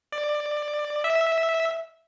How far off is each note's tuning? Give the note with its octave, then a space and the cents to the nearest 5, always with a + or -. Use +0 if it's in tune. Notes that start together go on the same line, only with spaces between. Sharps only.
D5 +15
E5 -10